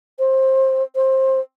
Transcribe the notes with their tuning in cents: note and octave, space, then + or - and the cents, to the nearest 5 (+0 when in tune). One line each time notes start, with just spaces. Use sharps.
C5 +20
C5 +20